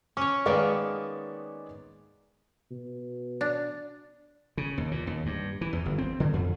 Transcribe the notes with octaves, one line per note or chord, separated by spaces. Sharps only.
C#4 C#5 D6
D#3 G#3 A#3 B3 B4 D5
B2
D4
C#3
D#2
A#2
D#2
G2
E3
E2
G1
C4
D3
F2